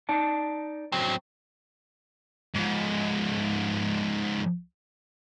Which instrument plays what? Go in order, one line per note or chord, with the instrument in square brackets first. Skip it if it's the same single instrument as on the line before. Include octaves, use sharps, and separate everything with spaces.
[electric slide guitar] D#4 D5 A5
[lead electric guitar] F#3 C4
[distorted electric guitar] G#2 F3